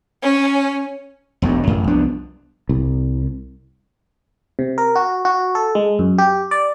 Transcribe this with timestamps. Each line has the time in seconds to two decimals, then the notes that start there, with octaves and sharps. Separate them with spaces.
0.23 C#4
1.42 E1 B1 G2 F#3
1.67 A1 F#2
1.87 C2 F3 B3 D4
2.69 C2
4.59 C3
4.78 A#4
4.96 F#4
5.25 F#4
5.55 A4
5.75 G#3
5.99 F#2
6.18 G4
6.51 D5